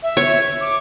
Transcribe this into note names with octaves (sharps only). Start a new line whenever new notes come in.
E5
C#5
D6